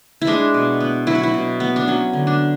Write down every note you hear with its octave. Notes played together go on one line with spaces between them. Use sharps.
E4
G#3 D4
B2
B3
F#3 E4
F#4
E4
B2
B3
D4
F#3 C#4
D3
D4